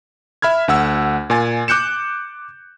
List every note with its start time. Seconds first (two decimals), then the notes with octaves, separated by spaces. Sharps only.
0.42 E5 B5 F6 G#6
0.68 D2 F#5 E6
1.30 A#2 G#5 A6
1.68 D6 F#6 G6 C#7 E7